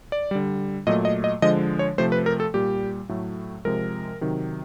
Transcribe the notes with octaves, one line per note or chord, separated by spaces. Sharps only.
D5
D3 G3
A#2 F#3 A3 D#5
D#5
D#5
D3 F3 G#3 D#5
C#5
C3 F3 A3 C5
B4
A#4
A4
A#2 G3 G4
A2 F#3 A3
C3 F3 G#3 A#4
C3 D#3 F#3